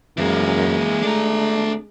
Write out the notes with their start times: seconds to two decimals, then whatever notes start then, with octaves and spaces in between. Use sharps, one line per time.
0.18 F#2 E3 G#3 A#3
1.03 A3 D4 A#5